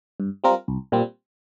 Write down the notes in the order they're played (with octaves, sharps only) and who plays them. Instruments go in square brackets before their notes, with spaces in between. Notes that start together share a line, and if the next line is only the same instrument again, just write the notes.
[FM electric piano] G2
G3 C4 F4 A#4
C2
A#2 G3 C4